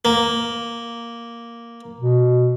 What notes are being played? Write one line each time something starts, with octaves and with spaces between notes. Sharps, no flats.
A#3
B2